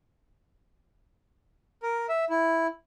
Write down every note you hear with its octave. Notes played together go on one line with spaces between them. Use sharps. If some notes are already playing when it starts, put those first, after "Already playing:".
A#4
E5
E4